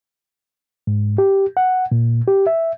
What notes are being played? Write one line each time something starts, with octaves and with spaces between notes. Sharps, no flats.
G#2
G4
F#5
A#2
G4
E5